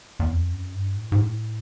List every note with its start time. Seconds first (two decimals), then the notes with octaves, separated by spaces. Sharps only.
0.20 E2
0.32 F2
0.53 F#2
0.75 G2
0.96 A2
1.12 G#2
1.18 A2